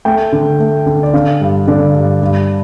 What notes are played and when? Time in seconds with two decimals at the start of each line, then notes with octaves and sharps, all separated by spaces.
0.05 A3 G5
0.32 D3
0.60 A3
0.86 D3
1.03 D5
1.14 D3 F5
1.41 G2
1.68 D3 D5
1.94 G2
2.22 G2